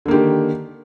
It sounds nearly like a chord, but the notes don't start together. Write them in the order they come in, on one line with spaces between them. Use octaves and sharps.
D3 A#3 G4 D#3